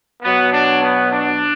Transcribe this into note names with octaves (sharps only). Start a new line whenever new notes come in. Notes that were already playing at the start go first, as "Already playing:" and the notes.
B2 F#3 B3
D4
B3
D4